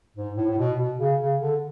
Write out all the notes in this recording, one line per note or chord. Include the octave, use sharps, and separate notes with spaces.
G#2
A2
A2
B2
B2
C#3
C#3
D3